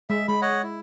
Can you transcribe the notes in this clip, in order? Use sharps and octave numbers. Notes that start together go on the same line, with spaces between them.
G#3 E5
G#3 B5
C#5 D#5 F#5
E4